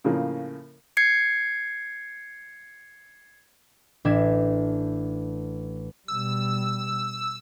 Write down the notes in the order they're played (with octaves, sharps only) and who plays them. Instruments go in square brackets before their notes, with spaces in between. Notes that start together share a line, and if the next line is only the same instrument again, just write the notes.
[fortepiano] A2 C#3 F3 A#3
[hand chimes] G#6 C7 C#7
[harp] A1 D4 E5 G#6
[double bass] B2 G3 [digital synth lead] E6